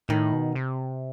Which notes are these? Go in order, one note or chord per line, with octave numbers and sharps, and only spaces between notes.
A2 D#3
B2
C3